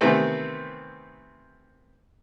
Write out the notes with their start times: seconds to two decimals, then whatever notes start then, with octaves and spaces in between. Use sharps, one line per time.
0.01 C3 D#3 E3 A3 B3 C4